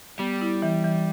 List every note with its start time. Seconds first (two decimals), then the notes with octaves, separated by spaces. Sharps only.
0.19 G3 B3
0.41 E4
0.62 E3
0.84 E3